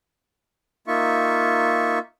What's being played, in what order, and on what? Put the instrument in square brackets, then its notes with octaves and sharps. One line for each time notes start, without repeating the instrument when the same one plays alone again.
[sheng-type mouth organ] A#3 D#4 F4 E5 C#6